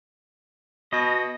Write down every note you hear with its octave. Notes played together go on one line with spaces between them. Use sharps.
B2 D#5